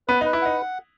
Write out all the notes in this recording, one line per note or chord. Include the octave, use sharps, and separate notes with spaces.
B3 B4
D#4
B4
E4
D#4 F#5